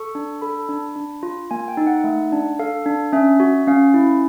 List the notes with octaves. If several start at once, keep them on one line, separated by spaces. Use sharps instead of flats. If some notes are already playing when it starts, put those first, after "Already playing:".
Already playing: A4 C#6
D4
A4 B5
D4
D4
F4
A#3 G#5
G5
D#4
F#5
A3
D4
A4 F5
D4
C#4 E5
F#4
C#4 F5
E4